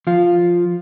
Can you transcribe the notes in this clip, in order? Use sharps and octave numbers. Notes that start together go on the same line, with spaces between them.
F3 F4